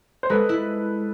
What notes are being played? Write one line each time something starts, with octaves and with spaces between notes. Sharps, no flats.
C5
G#3 A4 B4
E4